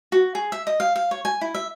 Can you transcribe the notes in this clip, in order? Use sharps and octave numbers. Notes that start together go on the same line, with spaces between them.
F#4
G#4
E5
D#5
F5
F5
C#5
G#5
E4
E5